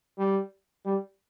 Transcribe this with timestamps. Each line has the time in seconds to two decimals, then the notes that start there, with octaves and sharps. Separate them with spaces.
0.18 G3
0.85 G3